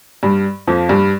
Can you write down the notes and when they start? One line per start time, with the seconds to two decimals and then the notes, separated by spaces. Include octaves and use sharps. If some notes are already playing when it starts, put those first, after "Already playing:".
0.23 G2 G3
0.67 F2 F3
0.89 G2 G3